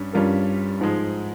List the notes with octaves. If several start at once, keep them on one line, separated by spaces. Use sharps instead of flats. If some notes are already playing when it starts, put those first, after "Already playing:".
Already playing: G2 G3 C#4
G2 G3 C#4 F4 A#4
G#2 F3 G#3